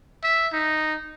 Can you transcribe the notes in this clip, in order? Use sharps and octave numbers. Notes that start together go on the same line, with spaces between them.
E5
D#4